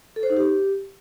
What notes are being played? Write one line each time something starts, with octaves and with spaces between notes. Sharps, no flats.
A4
C5
D#4
G4